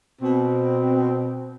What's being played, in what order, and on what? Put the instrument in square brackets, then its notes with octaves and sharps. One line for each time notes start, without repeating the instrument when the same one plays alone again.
[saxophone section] B2 C4